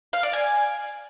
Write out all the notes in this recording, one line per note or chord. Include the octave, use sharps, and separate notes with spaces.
F5
D5
G#5